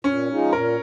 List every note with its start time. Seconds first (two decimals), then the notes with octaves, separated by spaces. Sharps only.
0.04 A#2 C#4
0.28 F3 G#3 D#4
0.52 A#2 A#4